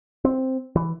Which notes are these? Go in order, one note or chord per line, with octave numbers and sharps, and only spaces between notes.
C4
E3